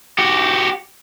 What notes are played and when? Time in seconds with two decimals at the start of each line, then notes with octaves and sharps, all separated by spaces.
0.18 F#4 G4